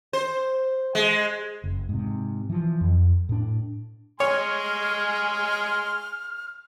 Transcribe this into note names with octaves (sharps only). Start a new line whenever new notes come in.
C5
G#3
F#1
G#2 C3
E3 F3
F2
A2 D4
G#3 C#5 G#5 C6 F6